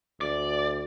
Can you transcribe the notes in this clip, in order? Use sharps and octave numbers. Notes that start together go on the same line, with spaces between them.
D2 D5